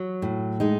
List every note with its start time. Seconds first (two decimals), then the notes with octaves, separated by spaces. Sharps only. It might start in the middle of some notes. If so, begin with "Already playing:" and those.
Already playing: F#3
0.22 A2
0.60 G#3 D#4